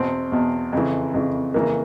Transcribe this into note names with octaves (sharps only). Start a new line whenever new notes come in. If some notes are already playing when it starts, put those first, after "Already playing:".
Already playing: E2 B2 C4
E2 B2
F2 C#3 E3
F2 C#3 E3
F2 C#3 E3 A#3